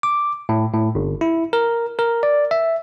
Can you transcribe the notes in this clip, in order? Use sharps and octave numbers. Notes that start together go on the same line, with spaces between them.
D6
A2
A2
G1
E4
A#4
A#4
D5
E5